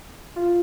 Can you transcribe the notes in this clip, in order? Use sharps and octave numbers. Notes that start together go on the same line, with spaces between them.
F4